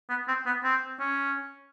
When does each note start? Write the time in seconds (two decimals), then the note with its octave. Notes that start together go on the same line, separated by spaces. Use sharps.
0.10 B3
0.28 C4
0.46 B3
0.64 C4
1.00 C#4